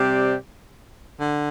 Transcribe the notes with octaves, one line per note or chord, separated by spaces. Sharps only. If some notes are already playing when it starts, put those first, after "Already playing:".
Already playing: C3 G3 C4 G4 D5
D3